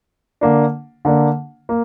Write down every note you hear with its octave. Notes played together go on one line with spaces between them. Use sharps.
D3 A#3 D4
D3 A#3 D4
A#3